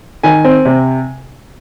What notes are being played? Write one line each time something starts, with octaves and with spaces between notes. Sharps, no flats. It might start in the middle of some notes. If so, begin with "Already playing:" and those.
D#3 G#5
C4
C3